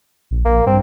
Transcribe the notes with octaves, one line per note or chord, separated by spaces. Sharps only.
A#1
A#1 A#3
G2 C4